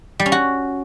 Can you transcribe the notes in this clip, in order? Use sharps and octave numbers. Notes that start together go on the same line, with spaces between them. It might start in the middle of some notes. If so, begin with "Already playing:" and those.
G3
C#4
F#4